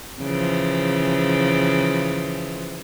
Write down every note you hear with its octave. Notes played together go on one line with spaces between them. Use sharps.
C#3 E3 F3